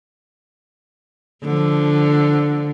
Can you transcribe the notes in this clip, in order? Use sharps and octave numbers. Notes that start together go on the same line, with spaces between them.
D3 F3